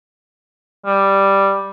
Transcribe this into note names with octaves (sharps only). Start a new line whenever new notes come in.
G3